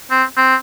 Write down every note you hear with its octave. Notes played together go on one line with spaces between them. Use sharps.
C4
C4